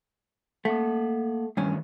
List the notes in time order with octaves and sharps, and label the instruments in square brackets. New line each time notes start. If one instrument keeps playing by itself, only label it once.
[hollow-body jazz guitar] A3 [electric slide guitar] A#3 F#5
[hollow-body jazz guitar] G2 C#4 [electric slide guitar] D#3 E3 A3